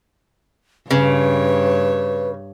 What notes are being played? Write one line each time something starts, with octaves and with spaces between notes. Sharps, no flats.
G2 C#3 B4 C#5